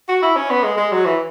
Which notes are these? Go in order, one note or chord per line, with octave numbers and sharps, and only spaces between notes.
F#4
E4
C#4
B3
G#3
G#3
F#3
E3